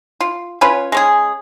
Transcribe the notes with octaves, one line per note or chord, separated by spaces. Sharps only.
F4
C#4 F4 B4 C#5
G#3 C#4 G#4